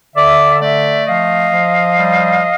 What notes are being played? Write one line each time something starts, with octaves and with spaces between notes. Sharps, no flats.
D3 D5 E5
A3 D5 E5
F3 D#5 F5
F3
G3